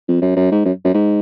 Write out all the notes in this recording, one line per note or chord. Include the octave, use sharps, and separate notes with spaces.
F2
F#2
F#2
G#2
F#2
F#2
G#2